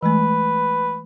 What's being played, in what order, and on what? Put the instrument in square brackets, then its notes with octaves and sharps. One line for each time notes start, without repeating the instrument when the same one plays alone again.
[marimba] E3 G#3 A3 [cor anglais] B4